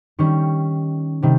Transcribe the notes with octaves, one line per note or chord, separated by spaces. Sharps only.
D#3 G3 C#4 C#6
C3 D#3 G3